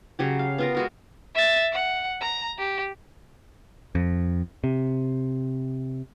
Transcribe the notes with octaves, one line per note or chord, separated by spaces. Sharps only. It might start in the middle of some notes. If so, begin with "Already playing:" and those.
C#3 F#3 G4
F5
B3 F4 A#4
G#3 F#4 A#4
E5 A6
F#5
A#5
G4
F2
C3